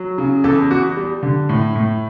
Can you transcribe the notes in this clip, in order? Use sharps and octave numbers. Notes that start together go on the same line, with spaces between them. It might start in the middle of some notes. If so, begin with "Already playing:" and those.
Already playing: F#3
C#3
E2 A4
E2 F#4
G3
D3
A2
A2